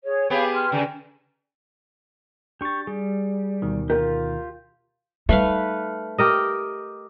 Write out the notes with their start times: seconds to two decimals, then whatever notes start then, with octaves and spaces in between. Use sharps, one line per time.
0.04 G#4 C#5
0.30 B3 G4 G#4 C#5 F5 B5
0.52 C6 F6
0.72 C#3 D5 G#5 A#5
2.61 D4 G4 C#6 A6
2.87 G3 G#4
3.62 D2 B2 D#3
3.90 F4 G4 A#4
5.29 G3 A3 D#4 B4 F5
6.18 G4 A#4 D#5